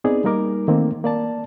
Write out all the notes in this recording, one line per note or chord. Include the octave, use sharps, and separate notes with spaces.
B3 C4 D#4 G#4 D5
G3 A#3 D#4 A#4 D6
D#3 A3 A#3 C4
A#3 D5 A5